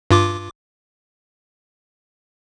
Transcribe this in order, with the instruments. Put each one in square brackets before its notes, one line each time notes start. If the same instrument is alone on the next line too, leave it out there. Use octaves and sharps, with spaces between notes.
[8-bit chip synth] G2 F4 D6